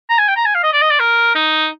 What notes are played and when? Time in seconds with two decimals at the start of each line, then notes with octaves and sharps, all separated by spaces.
0.10 A#5
0.19 G#5
0.28 G5
0.37 A#5
0.46 G#5
0.55 F5
0.64 D#5
0.73 D5
0.82 D#5
0.91 D5
1.00 A#4
1.36 D#4